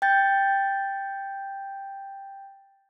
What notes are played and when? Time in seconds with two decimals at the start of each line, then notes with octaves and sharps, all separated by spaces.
0.02 G5 G6 A6